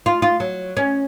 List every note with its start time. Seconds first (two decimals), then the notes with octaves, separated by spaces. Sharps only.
0.06 F4
0.22 F4
0.40 F#3
0.77 C#4